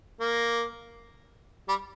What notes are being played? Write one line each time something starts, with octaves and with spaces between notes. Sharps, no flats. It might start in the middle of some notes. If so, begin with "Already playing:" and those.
A#3
G3